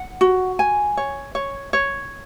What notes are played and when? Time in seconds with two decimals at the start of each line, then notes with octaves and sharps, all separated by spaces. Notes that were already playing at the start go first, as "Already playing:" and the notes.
Already playing: F#5
0.21 F#4
0.59 G#5
0.97 C#5
1.35 C#5
1.73 C#5